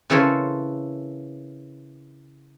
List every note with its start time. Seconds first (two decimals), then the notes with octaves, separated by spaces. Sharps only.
0.10 C#3 E3 A4 A#4 C5 C#5